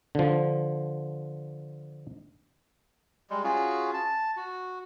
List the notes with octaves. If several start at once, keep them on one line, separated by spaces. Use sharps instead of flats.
D3 F3
G3 G#3
C#4 F4 F#4 G#4
A5
F#4